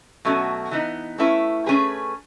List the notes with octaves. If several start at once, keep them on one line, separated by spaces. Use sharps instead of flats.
B2 F#3 A3 C#4 F#4
E3 B3 D#4
A3 C#4 E4 B4
A3 C#4 G#4 B4